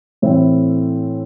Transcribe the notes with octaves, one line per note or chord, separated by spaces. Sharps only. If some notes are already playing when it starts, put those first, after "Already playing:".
A2 E3 C4 E4